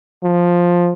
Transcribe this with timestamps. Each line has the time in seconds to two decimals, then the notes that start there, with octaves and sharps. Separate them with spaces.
0.24 F3